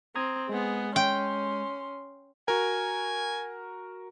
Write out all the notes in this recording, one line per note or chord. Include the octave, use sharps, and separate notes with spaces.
C4 A#5 D#6 G#6
G#3 B3 G#4
C#4 G5 C6
F#4 A#4 G#5